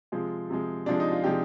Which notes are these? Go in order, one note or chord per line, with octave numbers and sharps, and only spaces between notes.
C3 F3 G#3 F4
C3 F3 G#3
C3 F3 G#3 D4
D#4
F4
C3 F3 G#3 G4